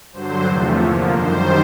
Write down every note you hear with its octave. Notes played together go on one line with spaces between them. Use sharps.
G2 D3 F#3 C5
E2 C3 F3 A3
D3 F3 A#3 C#5
F#2 D#3 G3 C5